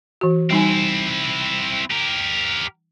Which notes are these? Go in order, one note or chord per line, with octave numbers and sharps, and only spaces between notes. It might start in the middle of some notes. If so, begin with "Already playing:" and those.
E3 F#4
G3 C4 D#4 E4 G#5
G4 A#4